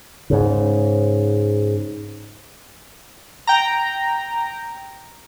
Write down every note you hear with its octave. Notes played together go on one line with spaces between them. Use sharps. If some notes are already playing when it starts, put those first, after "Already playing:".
G#2 C#3
G5 A#5